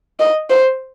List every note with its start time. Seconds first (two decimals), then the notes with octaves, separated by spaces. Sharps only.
0.20 D#5
0.50 C5